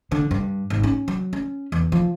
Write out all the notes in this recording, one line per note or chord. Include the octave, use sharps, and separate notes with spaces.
D3
G2
G#1
C#4
F#3
C#4
E2
F3